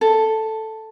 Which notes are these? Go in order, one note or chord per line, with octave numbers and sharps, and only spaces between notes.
A4